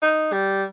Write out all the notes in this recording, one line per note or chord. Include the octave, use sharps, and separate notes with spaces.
D#4
G3